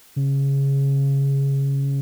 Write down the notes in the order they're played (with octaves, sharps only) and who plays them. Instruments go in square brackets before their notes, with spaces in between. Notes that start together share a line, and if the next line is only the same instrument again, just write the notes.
[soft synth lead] C#3